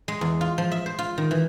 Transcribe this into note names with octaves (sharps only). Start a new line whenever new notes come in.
G#3
E2
F4
F3
E5
C5
F4
D#3
E3